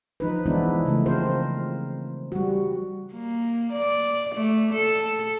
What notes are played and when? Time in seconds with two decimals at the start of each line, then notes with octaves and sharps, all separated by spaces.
0.20 F3 D#4 B4
0.46 E3 G#3 B3 D4 E4
0.85 C#3 F3 A3
1.06 C4 F4 A#4 C5
2.32 G3 F#4
3.13 A#3
3.73 D5
4.35 A3
4.73 A4